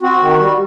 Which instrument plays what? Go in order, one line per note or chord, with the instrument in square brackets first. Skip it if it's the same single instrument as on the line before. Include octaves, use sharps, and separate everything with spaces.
[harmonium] C4 F#4
D#3
G3